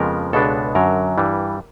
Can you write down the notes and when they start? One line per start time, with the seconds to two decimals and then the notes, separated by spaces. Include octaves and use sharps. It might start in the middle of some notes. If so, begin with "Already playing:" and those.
Already playing: F2 C#3 F3 G#3 B3 A#4
0.33 C#2 B2 G#3 B3 D4 A4
0.75 F#2 D3 F#3 A#4
1.18 G2 E3 G3